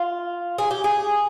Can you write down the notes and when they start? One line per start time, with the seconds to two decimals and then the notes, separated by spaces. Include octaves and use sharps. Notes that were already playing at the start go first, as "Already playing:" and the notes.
Already playing: F4
0.58 G#4
0.71 G4
0.84 G#4